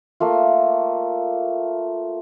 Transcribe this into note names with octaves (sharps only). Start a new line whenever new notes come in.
A3 A#3 F4